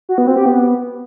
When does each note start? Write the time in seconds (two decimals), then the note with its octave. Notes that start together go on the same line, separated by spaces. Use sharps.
0.09 F#4
0.18 B3
0.27 C4
0.37 G4
0.46 B3